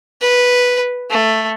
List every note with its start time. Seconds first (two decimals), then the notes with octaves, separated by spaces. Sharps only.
0.22 B4
1.10 A3